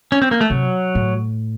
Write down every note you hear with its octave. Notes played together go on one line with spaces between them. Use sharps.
C#4
C4
A#3
A3
C3 F#3
A2